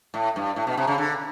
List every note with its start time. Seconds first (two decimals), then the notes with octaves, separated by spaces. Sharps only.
0.14 A2
0.36 G2
0.56 A2
0.67 B2
0.77 C3
0.87 C#3
0.98 D3